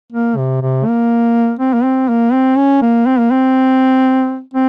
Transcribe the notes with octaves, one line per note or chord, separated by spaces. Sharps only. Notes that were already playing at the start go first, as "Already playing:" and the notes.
A#3
C3
C3
A#3
C4
A#3
C4
A#3
C4
C#4
A#3
C4
A#3
C4
C4